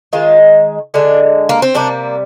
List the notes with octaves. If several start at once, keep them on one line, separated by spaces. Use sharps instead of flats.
D#3 G#3 F4
D3 G#3 D4
A#3
C4
C3 G3 A#3 D4